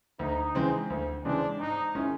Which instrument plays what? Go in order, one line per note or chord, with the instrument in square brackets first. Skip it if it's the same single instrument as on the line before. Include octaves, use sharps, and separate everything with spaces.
[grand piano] D2 [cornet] D#4
[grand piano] C#3 E3 G#3 C4
D2
[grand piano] C#3 E3 G#3 C4 [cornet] D4
[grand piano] G#2 [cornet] D#4
[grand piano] D#3 G#3 C#4 E4